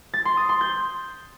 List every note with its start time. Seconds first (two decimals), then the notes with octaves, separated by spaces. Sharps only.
0.14 A6
0.25 C6
0.37 D#6
0.49 C6
0.61 G6